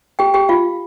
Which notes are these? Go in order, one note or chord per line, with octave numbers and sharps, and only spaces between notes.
G4 G5
G4 G5
F4 F5